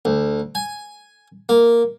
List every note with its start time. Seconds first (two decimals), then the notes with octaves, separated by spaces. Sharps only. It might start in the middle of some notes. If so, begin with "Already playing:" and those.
0.05 D2
0.55 G#5
1.49 A#3